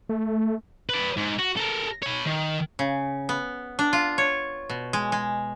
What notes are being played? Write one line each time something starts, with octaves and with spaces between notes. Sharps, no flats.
A3
B4 D5
G#2
F#4
A4 A#4
C#5 B5
D#3
C#3
B3
D4
F4
C#5
B2
G#3
G#3